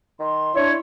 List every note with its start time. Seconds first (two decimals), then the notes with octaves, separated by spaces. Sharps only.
0.20 D#3 C6
0.55 D4 E4 C#5